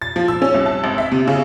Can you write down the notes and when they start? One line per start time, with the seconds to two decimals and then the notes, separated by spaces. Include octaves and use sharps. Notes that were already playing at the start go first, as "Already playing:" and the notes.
0.02 A6
0.16 F3
0.28 E6
0.42 C#4
0.54 C2
0.66 A5
0.84 G#1
0.98 E5
1.12 C3
1.28 C#3